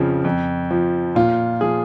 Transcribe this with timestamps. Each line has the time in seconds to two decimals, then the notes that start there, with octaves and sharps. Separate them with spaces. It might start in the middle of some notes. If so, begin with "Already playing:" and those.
Already playing: F2 C#3 F3
0.24 F2
0.71 F3
1.15 A#2 F4
1.61 F3 G#4